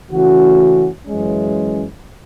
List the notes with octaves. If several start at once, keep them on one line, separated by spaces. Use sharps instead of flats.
C#3 E3 A3 C#4 F#4
F#2 E3 G#3 C#4